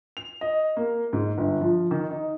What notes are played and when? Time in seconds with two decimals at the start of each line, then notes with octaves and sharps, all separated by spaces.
0.17 F7
0.41 D#5
0.77 A#3
1.13 G#2
1.38 G1
1.61 F3
1.91 D#3
2.11 D#4